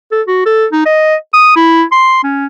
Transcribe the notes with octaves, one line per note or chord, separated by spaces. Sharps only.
A4
F#4
A4
D#4
D#5
D#6
E4
C6
C#4